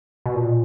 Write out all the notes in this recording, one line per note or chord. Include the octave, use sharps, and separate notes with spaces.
B2
A#2